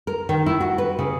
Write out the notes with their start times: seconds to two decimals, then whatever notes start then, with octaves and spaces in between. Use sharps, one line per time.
0.07 A#4
0.29 D#3
0.46 E4
0.60 F#4
0.78 B4
0.99 C#3